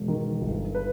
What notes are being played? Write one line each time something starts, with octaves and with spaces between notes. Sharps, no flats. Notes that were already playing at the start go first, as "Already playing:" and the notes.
Already playing: E1
D#3
G1
B4